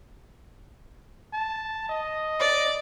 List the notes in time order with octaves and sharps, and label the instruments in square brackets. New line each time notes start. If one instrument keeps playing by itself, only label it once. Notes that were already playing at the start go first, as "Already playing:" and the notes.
[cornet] A5
D#5
[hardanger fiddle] D5